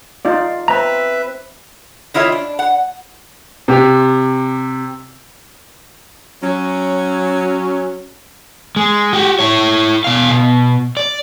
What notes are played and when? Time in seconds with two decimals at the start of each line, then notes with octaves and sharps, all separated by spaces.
0.25 D#4 F4 D5
0.68 C4 B4 E5 A#5
2.14 D#3 E4 F4 C#5 E5
2.32 D4
2.59 F#5
3.68 C3 G4
6.42 F#3 C#4
8.76 G#3
9.13 F#4 G4
9.39 E4 C#5
10.04 B2 F5
10.30 B2
10.97 D5